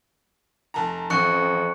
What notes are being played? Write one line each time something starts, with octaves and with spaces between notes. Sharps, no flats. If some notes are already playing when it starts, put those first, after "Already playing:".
F1 A5 A#5
A1 F2 C#6 F#6 C#7